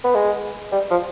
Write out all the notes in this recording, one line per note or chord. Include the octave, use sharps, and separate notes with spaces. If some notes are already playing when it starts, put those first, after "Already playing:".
B3
G#3
G3
F3